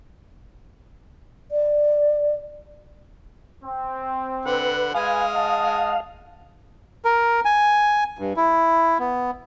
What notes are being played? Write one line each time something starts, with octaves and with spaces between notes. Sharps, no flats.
D5
C4
D3 B4 F#5
G#3 B4 F5 G#5 D#6
D#5 F#5 A5
A#4
G#5
G2
E4
B3